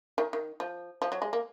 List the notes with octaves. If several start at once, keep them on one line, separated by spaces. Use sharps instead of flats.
D#3
D#3
F3
F3
F#3
G#3
A#3